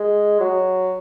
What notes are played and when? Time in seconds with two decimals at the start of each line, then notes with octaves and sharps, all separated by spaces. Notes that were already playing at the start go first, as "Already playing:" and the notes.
Already playing: G#3
0.40 F#3